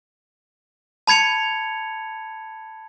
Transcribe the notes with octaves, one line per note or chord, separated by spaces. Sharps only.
A5 B5 G#6 C#7 F7